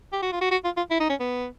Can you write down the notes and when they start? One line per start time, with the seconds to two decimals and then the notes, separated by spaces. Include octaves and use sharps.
0.13 G4
0.22 F#4
0.32 F4
0.41 F#4
0.51 F#4
0.65 F4
0.77 F4
0.90 E4
1.00 D#4
1.10 C#4
1.20 B3